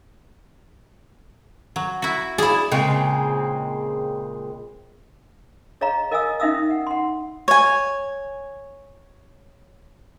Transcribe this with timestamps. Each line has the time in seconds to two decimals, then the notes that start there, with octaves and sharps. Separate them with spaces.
1.76 F#3
2.02 E4 F#4
2.38 E4 G#4 D5
2.71 A#2 C#3 G#3 C4
5.81 G#4 C#5 D#5 F5 A#5
6.11 A#4 D#5 F5 G#5 D#6 E6
6.40 C#4 D#4 E5 F5 D#6 E6
6.70 F#5
6.87 F#5 C6
7.48 C#5 G#5